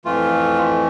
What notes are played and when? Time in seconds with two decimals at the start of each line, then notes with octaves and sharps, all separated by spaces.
0.05 F2 E3 A3 F4